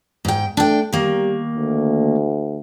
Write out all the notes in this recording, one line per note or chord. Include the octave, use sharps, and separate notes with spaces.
G#2 G5
A3 D4 G5
D#3 G3 A#3
D2